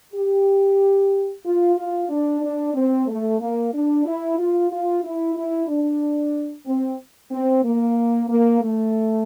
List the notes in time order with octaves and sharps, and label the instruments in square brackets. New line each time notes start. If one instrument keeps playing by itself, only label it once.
[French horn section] G4
F4
F4
D4
D4
C4
A3
A#3
D4
E4
F4
F4
E4
E4
D4
C4
C4
A#3
A#3
A3